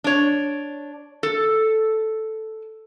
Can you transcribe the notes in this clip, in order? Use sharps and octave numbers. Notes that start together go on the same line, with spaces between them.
D4 C#5
A4